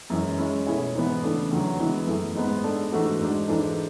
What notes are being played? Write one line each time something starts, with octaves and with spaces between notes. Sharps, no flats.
F#2 E3 G#3 C#4
G#3 C#4 E4
B2 A3 E4 G#4 C#5
G#2 E3 B3
C#3 E3 A3 D4
E2 D3 F#3
E3 G#3 B3 E4
F#2 E3 A3
G#2 G#3 B3
G#3 D4 A4 D5
G#2 E3 A3 D4 F#4
G#2 G#3 D4
G#2 E3 G#3 D4 A4